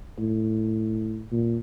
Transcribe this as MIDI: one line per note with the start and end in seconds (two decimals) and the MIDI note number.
0.18 1.25 45
1.32 1.58 46